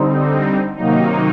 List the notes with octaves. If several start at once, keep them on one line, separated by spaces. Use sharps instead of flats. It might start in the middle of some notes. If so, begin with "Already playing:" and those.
Already playing: D3 G3 C4 D#4
C3 D#3 F#3 A#3 D#4